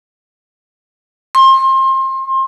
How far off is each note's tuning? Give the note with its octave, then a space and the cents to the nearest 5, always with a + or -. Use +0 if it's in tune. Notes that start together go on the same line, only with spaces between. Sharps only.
C6 +30